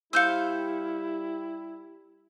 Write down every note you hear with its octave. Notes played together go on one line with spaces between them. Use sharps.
G3 E4 G4 C5 F5 E6 G6 C#7